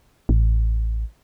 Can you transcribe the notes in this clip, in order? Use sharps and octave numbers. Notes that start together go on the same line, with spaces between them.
A1